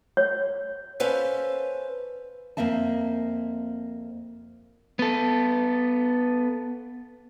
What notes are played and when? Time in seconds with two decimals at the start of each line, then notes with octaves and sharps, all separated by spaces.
0.17 C#5
1.00 C#4 A4 B4 C5 F5
2.57 F2 G#3 A#3 C4 E5 A5
4.99 B3 A4